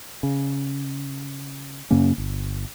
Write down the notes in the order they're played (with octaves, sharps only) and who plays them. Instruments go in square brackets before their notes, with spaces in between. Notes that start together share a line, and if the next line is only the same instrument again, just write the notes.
[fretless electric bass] C#3
F#2 C#3 A#3 C#4
G1